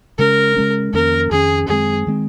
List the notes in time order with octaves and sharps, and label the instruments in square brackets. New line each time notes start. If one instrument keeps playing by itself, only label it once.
[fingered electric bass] C#3 G#3 C#4 [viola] A#4
[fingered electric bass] C#3 G#3 C#4
[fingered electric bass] F2 D#3 A#3 C#4 [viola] A#4
[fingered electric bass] F2 D#3 A#3 C#4 [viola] G#4
[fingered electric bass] F#2 D#3 G#3 C4 [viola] G#4
[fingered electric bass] D#3 G#3 C4